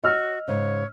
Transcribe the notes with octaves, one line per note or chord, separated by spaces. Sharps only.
F#4 C#5 D#5 E6 F6
G#2 C#3 C#5